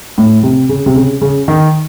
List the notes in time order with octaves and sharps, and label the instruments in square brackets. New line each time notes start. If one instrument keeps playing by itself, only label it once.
[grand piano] A2
C3
C#3
C3
C#3
C#3
D#3